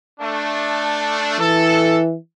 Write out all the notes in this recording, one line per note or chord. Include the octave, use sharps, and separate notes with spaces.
A3 D4
E3 A4